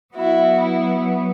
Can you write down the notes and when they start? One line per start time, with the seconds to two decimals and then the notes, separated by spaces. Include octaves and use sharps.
0.14 F#3 B3 E4 F#4
0.59 E4